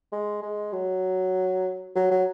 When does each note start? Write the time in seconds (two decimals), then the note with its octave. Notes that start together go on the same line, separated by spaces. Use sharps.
0.12 G#3
0.43 G#3
0.73 F#3
1.96 F#3
2.11 F#3